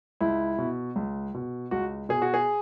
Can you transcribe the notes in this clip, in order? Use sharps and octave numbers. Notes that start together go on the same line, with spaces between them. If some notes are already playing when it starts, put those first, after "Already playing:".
C#2 E4
B2
C#2
B2
C#2 F#4
B2 G#4
F#4
G#4